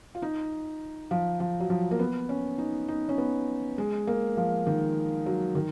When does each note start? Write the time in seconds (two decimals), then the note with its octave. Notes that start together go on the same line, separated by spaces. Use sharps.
0.15 F4
0.22 D#4
1.11 F3
1.40 F3
1.60 F#3
1.70 F3
1.91 A#3
1.99 B3
2.29 C#4
2.58 D#4
2.88 D#4
3.09 C#4
3.18 B3
3.78 G#3
4.07 A#3
4.37 F3
4.67 D#3
5.26 F#3
5.55 D#3